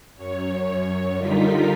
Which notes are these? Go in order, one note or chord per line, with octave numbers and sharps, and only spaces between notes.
F#2 C#5
D3 G3 D#4 F4 A#4 B6